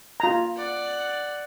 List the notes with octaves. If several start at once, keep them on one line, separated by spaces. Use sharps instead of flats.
F4 A#5
D5 F#5